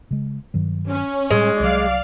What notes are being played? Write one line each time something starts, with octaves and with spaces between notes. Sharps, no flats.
C#3 G#3
G2 D#3 F#3
C#4
A2 G3 G#3
C2 F#3 D5 F5